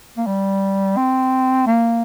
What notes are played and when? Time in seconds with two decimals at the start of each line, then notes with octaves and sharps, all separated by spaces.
0.18 A#3
0.27 G3
0.97 C4
1.67 A#3